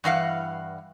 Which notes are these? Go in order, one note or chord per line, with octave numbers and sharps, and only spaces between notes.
G2 E3 F5 F#5